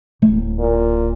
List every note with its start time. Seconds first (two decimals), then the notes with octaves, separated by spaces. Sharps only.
0.22 D1
0.59 A#2